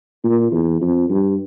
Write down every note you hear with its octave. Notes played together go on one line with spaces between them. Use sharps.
A#2
E2
F2
G2